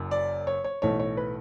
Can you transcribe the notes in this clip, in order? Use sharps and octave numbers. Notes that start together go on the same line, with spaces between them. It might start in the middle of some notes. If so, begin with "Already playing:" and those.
Already playing: F#1 F#2
D5
C#5
C#5
B1 A2 E3 A3 C#5
C#5
B4